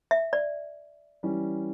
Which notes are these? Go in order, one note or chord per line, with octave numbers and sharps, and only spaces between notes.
E5
D5
E3 G3 C#4